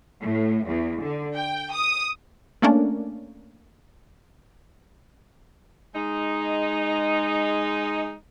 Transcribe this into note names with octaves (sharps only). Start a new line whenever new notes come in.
A2
E2
D3
G5
D#6
A3 A#3 C#4 D4
G#3 D#4